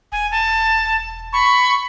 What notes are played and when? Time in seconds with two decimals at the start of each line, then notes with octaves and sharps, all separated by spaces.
0.12 E1 G#5
0.32 A5
1.33 B5 C#6